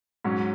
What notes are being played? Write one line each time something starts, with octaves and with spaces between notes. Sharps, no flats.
G#2 F#3 C#4